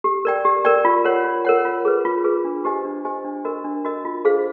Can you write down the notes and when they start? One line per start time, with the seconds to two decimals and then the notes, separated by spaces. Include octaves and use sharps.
0.04 G4
0.25 A#4 D5 G5
0.45 G4
0.64 A#4 D5 G5
0.85 F4
1.05 A#4 C#5 F#5
1.24 F4
1.45 A#4 C#5 F#5
1.65 F4
1.85 G#4 B4
2.05 F4
2.24 G#4 B4
2.45 D4
2.65 G4 C5 D#5 G#5
2.85 D4
3.05 G4 C5 D#5 G#5
3.24 D4
3.45 F#4 A#4 D#5
3.65 D4
3.85 F#4 A#4 D#5
4.05 F4
4.25 G#4 C5 F5